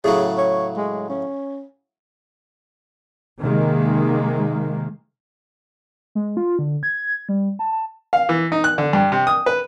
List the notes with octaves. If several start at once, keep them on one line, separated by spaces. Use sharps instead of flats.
A2 C#3 F#3 G#4
C#5
G#3
C#4
C3 D#3 G#3 A#3
G#3
F4
D3
G#6
G3
A5
A5
F5
E3
D#4
F#6
D3
G2
C3
D#6
B4